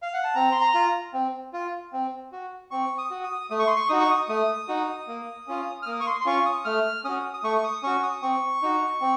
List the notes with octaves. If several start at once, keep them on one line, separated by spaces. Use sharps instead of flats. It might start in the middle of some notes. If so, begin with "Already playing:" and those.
F5
F#5
A5
C4 A#5
C6
A#5
F4
C4
F4
C4
F#4
C4 C#6
D#6
F#4
D#6
A3 D#6
C#6
C6
C#6
D#4 F#4 D#6
C#6
D#6
A3 D#6
D#4 F#4
A#3
C#4 F4
F6
A#3 D#6
C#6
C6
C6
C#4 F4 C#6
D#6
A3 F6
C#4 F#4 D#6
D#6
A3 C#6
C#6
D#6
C#4 F#4 C#6
D#6
C4 C#6
D#4 F#4
C4